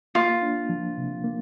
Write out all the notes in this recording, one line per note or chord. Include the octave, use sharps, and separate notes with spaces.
A#3 F4
D4
F3
C3
A#3